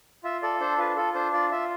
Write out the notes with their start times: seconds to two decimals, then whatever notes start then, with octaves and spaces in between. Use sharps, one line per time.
0.24 F4 E5
0.42 A4 D5
0.61 D4 C5
0.78 F4 B4
0.97 F4 A4
1.14 D4 C5
1.33 F4 D5
1.52 F4 E5